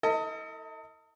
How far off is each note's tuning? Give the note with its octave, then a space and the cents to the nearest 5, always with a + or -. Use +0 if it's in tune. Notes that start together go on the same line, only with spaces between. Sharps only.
E4 -35 A4 +45 D#5 +25